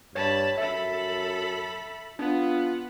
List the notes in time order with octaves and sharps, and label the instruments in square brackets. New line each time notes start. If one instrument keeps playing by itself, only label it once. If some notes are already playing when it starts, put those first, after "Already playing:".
[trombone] G2 [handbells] C#5 [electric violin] A5 B5
[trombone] F#2 [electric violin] A4 B5 [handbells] E5
[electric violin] B3 [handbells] D4 [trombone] F4